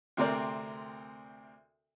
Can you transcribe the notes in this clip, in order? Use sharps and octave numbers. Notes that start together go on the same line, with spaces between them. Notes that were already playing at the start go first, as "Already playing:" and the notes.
D2 C3 C4 A#4 D5